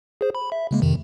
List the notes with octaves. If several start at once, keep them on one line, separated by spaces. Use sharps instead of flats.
G#4 C5
B5
E5
C#3 G#3 A#3
F2 C3 D#3